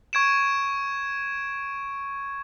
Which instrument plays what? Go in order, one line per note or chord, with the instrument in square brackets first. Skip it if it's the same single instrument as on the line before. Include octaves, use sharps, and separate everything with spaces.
[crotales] C#6 G#6 D7 E7